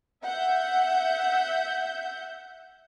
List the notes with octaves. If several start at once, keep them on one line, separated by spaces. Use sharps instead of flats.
E5 F#5 G6